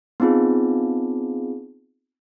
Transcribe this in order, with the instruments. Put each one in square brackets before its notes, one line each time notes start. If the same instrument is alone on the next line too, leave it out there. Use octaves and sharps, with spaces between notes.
[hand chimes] B3 C4 D#4 F4 G#4